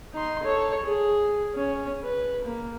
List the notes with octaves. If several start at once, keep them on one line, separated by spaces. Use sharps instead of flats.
D#4 C6
A4 C#5
G#4
C#4
B4
A#3